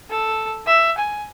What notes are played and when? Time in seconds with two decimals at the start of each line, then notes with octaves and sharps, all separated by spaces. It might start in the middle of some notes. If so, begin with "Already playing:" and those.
0.10 A4
0.67 E5
0.98 G#5